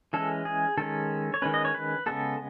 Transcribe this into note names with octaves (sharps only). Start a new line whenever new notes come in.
E3 G#3 C#4 A4
G#4
D#3 G#3 C#4 A4
C#5
D#3 G#3 C#4 B4
D#5
C#5
B4
C#3 G#3 B3 A4